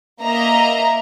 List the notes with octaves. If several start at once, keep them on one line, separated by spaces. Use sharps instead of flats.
A#3 D#5 E5 A#5